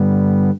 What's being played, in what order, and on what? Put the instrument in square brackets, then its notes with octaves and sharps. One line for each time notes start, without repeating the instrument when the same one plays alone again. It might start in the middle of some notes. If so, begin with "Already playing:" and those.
Already playing: [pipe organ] G2 D3 G3 B3